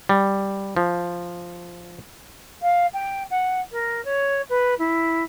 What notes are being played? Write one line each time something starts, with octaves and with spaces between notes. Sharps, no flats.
G3
F3
F5
G5
F#5
A#4
C#5
B4
E4